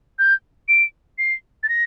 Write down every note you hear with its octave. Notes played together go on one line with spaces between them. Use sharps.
G6
D7
C7
A6
A#6